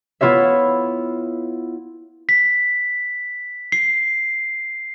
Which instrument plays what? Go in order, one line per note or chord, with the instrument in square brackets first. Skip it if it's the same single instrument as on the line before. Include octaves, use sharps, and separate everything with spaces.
[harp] B3 E4 F4 C#5 E5
[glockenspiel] B6
C7